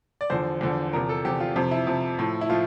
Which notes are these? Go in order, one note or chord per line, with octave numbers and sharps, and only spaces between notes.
D5
E2 D3 F3 C5
E2 D3 F3
E2 C3 F3 A#4
A4
E2 C3 F3 G4
F4
F2 C3 F3
E4
F2 C3 F3
A2 F3
E4
A2 F3 F4